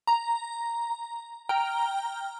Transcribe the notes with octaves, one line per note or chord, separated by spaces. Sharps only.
A#5
G5 A#5 F6